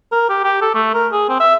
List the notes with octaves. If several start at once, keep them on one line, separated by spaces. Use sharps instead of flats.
A#4
G4
G4
A4
A3
A#4
G#4
C4
E5